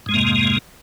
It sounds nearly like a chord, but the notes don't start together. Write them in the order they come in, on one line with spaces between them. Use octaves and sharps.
G#2 G#3 F2 A#3 C3